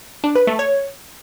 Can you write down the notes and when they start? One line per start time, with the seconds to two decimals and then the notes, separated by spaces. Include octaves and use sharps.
0.24 D4
0.35 B4
0.47 A3
0.59 C#5